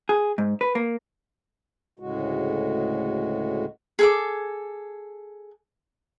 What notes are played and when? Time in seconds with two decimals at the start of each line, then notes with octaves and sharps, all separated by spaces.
0.09 G#4
0.38 G#2
0.61 B4
0.75 A#3
1.99 D2 A2 C#3 G#3 F#4
3.99 G#4 A4 D6